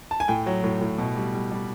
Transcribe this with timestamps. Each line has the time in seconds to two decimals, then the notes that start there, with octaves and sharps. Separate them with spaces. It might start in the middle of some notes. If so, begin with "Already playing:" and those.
0.11 A5
0.20 G#5
0.28 A2 G5
0.46 F#3
0.64 A2
0.81 A2
0.98 B2
1.16 G3
1.34 G3
1.52 G3